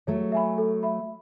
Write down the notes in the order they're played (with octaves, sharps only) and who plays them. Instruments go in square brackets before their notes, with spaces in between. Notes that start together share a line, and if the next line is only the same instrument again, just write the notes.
[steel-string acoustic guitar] F#3 A3 [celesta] C#5
[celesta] E5 G#5 B5
A4
E5 B5